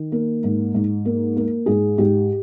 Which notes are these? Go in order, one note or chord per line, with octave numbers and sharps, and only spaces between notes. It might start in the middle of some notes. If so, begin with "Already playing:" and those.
Already playing: D#3
A#3
G#2
G#2
A#3
A#3
G#2 G#4
G#2 G4